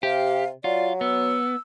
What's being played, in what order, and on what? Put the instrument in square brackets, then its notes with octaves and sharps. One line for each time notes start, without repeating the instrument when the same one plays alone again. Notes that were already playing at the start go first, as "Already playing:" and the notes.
[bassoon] C3 [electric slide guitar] G4 [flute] F5
[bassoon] F#3 [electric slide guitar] F4 [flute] D5
[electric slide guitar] B3 [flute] E6